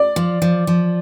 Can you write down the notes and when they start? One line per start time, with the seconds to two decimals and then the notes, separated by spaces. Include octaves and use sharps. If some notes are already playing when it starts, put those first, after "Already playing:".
Already playing: D5
0.16 F3
0.42 F3
0.67 F3